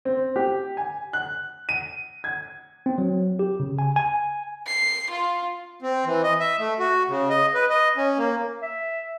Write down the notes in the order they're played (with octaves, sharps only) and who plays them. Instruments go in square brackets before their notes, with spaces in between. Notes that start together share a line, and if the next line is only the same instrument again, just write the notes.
[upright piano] C4
G4
G#5
F#6
D#7
G#6
[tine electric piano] C4
F#3
G4
C#3
G#5
G#5
[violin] C7
F4
[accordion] C4
E3
D#5
E5
A3
F#4
C#3
D#5
B4
D#5
C#4
A#3
[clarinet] E5